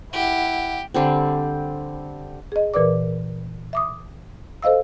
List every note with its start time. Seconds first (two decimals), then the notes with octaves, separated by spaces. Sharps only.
0.13 E4 G4 F#5
0.94 D3 G3 C4
2.52 G#4 D#5
2.74 A#2 E3 A#4 B4 D5 D6
3.73 E5 D6 D#6
4.63 A4 C5 D#5 F5 E6